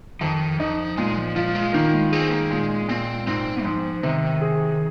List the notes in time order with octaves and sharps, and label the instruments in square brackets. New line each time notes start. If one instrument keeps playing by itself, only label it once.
[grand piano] F2 [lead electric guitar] D#3
[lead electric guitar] F3 [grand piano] D#4
[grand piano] A#2 [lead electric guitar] G#3
[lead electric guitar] F3
[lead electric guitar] F3 [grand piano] F4
[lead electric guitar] G#3
[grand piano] D#3 [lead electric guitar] A#3
[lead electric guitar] G#3
[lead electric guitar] C4 [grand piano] G#4
[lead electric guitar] A#3
[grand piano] A#2 [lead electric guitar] G#3
[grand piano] A#2 [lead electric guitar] C4
[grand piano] G#2 [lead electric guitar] C4
[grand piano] G#2 [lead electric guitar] F3
[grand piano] C3 [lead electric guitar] D#3
[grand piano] G#4